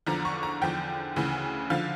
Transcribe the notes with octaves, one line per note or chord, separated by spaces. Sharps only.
E2 D3 F3 A#5
C#6
A#5
E2 D3 F3 G5
D2 C#3 E3
D3 F3 F5